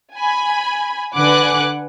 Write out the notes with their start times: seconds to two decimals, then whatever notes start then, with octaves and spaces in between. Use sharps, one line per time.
0.17 G#5 B5
1.15 D3 B4 F#5 G#5 D6 F#6